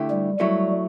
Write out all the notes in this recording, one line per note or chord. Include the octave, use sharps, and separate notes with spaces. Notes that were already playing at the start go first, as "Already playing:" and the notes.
Already playing: D2 D3 A3 E4 G4
G3
F#3 G3 A3 E4